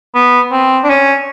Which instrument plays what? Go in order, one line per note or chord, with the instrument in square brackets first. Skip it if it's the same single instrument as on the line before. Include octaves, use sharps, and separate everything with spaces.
[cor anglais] B3
C4
D4
C#4